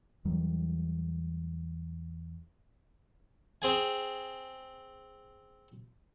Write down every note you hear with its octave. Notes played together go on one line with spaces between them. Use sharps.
E2 E3 F#3 G3
C4 G#4 G#5